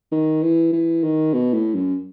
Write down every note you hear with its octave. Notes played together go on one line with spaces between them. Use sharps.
D#3
E3
E3
D#3
B2
A2
F#2